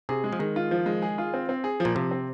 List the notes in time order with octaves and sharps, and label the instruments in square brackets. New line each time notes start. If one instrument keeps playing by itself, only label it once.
[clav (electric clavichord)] C3 [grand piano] G#4
[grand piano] G#3
[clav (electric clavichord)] F3
[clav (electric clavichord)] D#3 [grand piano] G#3
[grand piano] F4
F3
G#3
G#4
F4
C4
C4
G#4
F3
[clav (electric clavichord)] A#2
[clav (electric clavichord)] C3 [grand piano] F3
[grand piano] C4